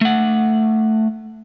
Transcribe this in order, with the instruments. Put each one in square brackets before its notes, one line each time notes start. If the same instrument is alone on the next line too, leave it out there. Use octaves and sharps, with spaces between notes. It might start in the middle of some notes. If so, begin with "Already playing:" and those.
[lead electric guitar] A3 F#5